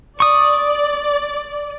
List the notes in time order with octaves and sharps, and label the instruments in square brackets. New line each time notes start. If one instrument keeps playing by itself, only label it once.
[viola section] D5 [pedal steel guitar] C#6 D#6